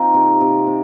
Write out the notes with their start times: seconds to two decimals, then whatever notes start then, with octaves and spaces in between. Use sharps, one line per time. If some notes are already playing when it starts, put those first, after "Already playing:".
Already playing: C4 D#4 F4
0.14 C3
0.41 C3
0.67 C3